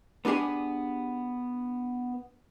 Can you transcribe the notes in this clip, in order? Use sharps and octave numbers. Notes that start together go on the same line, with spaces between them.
B3 D4 G4 G#4 G#5